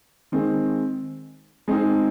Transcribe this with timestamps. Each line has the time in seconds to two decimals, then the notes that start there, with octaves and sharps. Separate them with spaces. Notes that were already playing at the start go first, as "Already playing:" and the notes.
0.32 D#3 G#3 C4
1.68 G#3 C4 D#4 G#4